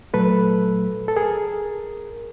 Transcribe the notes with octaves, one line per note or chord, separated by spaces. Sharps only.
A#2 F#3 A3 A4 B4
A4
G#4 A#4